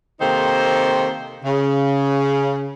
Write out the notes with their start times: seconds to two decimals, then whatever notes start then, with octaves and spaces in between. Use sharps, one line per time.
0.21 C3 D#3 A#3 D#4 A4 C5
1.43 C#3